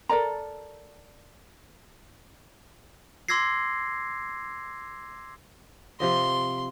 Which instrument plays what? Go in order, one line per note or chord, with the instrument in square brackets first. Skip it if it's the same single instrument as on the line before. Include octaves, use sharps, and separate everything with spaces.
[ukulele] A4 A#4 D5 A#5
[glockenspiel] C6 D6 E6 G#6 A#6 C7
[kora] C3 F3 D#5 [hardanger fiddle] C6